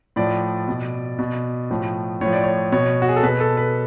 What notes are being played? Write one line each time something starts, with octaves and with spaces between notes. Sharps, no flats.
A2 F3 D5
B2
B2
A2 F3
A2 F3 C#5
D5
C#5
B2 C#5
F#4
G#4
A4
B2 B4
A4
B4